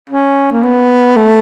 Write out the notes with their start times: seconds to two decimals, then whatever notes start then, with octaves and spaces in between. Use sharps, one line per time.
0.10 C#4
0.52 A#3
0.63 B3
1.16 A3